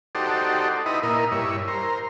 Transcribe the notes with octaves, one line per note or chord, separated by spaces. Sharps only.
D#4 F#4 G4 A4 C5 D5
D#4 E4 B4 D#5
A#2 E4 A#4 D#5
G2 E4 C#5
A#4 C5